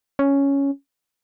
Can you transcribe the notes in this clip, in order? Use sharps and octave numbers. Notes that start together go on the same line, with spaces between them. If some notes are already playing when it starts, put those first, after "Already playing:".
C#4